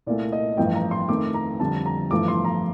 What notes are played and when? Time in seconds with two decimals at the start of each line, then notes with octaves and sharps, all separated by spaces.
0.06 C2 A#2 A3 D5
0.32 D#5
0.57 A1 G2 F3 A3 G5
0.75 A#5
0.91 C6
1.09 F2 D#3 A3 D6
1.34 A#5
1.60 F2 D3 G3 A5
1.86 A#5
2.11 A1 G2 F3 A3 D6
2.28 C6
2.45 A#5